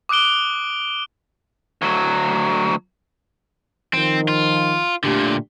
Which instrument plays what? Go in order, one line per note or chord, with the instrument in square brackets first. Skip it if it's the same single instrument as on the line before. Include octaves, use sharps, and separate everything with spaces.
[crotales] D6 D#6 F#6 D7 G7
[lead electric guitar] D2 F#3
[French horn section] D#3 F3 [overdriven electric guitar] C4
[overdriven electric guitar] F4
[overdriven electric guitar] A#2 D3 [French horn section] A3 D4 G4